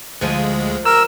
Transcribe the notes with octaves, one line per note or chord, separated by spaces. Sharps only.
D2 F3 G#3 G#5
A#4 E6